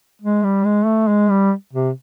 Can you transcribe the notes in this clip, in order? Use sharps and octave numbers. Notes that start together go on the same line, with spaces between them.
G#3
G3
G#3
A3
G#3
G3
C3